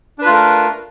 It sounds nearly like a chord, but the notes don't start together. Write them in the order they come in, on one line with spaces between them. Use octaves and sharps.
D4 B4 F4 A3 A#4